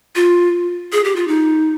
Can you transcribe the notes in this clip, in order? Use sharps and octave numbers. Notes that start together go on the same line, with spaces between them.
F4
G#4
G4
F4
D#4